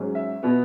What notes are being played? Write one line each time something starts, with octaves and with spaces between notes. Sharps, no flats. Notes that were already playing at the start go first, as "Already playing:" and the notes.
Already playing: G#2 F#3 C#4
E5
B2 B3